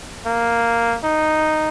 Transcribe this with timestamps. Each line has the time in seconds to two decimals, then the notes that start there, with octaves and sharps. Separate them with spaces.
0.26 A#3
1.04 D#4